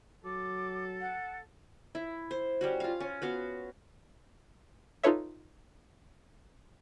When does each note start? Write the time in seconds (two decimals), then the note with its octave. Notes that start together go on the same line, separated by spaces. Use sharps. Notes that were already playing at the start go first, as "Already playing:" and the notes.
0.24 F#3 A4 D6
1.01 F#5
1.95 E4
2.31 C5
2.61 G3 C#4 F#4
2.80 F4 F5
3.00 C#4
3.22 B3 F#4 F5
5.04 D#4 F4 A4 B4 C#5 E5